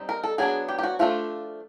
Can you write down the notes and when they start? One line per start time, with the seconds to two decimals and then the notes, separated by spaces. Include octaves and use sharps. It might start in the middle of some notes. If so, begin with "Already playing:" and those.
Already playing: G3 C4 D#4
0.09 A#4
0.24 A4
0.38 F#3 B3 D4 G#4
0.69 G4
0.79 G4
0.83 F#4
0.99 F3 A3 D4 F4